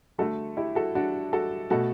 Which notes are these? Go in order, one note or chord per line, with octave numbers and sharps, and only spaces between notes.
D3 A3 F#4 A4
E4 G4
F#4 A4
D4 F#4
F#4 A4
B2 A3 F#4 A4